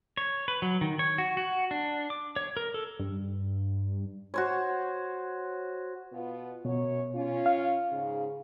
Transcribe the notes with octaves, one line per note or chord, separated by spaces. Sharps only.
C#5
B4
F#3
D#3
C#5
F#4
F#4
D4
D6
C#5
A#4
A4
G2
F#4 C5 C#5
B2 B3 F4
F#2 B2 C#5
C#4 F4
F5
G#2 C#3